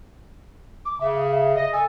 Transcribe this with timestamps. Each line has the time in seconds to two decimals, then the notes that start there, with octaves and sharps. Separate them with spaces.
0.85 D6
1.00 C#3 E5
1.56 D#5
1.73 A4 G#5